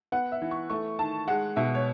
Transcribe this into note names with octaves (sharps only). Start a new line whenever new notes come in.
B3 F#5
E5
E3
C#6
A3 C#6
D#3 A5
G#3 F#5
B2 E5
C#5